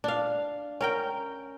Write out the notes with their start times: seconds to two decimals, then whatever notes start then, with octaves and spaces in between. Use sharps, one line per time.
0.04 D4 F5
0.81 C#4 A#4 G5